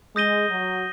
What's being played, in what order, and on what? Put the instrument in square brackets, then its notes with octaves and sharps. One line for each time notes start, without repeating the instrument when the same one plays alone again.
[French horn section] G#3 [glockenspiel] D#6 G6 A#6 D#7 G7
[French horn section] F#3